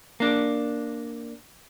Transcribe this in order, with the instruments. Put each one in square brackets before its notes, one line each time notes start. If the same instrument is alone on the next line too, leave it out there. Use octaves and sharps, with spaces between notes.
[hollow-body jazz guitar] A#3 D4